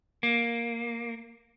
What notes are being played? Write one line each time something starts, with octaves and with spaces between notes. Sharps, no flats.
A#3